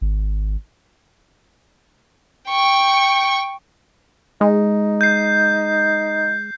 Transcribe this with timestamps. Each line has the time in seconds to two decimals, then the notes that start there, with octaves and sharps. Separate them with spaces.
0.01 G#1
2.49 G5 C#6
4.41 G#3 D#4
5.01 G6 C7